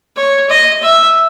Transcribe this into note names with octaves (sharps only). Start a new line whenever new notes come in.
C#5
D#5
E5